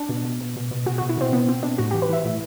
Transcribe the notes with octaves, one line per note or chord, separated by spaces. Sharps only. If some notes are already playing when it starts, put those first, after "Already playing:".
Already playing: D4
B2
B2
B2
B2
B2
B2 F#4
B2 F#4
E4
B2 C4
B2 B3
B2 C4
B2 D4
A2 F#4
E3 G4
B4
E3 E5
A2